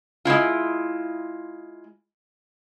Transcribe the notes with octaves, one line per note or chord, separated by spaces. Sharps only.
G#3 C4 E4 F4